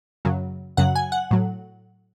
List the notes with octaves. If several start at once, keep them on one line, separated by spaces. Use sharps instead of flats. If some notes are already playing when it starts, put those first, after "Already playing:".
F#2 C#3 F#3
F#2 C#3 F#3 F#5
G#5
F#5
A2 F#3